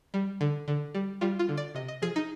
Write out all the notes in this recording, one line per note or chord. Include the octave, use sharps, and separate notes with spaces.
G3
D3
D3
G3
G3 F4
F4
D3
D5
C3 D#5
D#5
F3 G#4
D#4